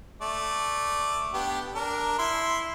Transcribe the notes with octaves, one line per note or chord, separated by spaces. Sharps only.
A3 D5
B3 D4 G4
D4 A#4
E4 C6